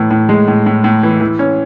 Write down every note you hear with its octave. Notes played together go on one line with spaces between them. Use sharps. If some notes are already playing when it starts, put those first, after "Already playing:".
Already playing: A2 E3
A2
G#3
A2
A2
A2
E3
E3
C#4